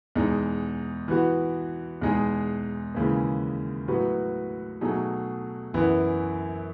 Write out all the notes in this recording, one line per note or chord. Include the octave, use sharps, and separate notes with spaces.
E2 B2 G#3 D#4
E3 B3 F#4
E2 B2 G#3 D#4 G#4
D#2 C#3 E3 G#3 C#4
A2 F#3 B3 F#4 B4
B2 F#3 A3 D#4 G#4
F#2 E3 B3 E4